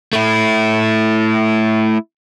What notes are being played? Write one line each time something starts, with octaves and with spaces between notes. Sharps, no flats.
A3 E4